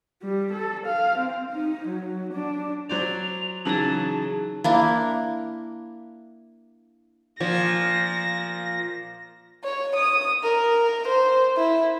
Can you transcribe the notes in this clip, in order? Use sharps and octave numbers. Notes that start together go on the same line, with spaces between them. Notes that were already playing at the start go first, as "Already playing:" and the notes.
G3
A4
F5
C4
D#4
F#3
D4
F#3 C5 D5 F7
C#3 E3 F#3 D#4 G#4 A5
A#3 D4 E4
A#2 F3 A#6
C#5
D#6
A#4
C5
E4